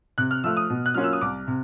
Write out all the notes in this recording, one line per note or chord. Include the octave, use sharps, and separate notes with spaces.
C3 F#6
F6
F3 A3 E6
D#6
B2
F#6
F#3 A#3 C#4 F4 F6
E6
D#6
C2 D6
C3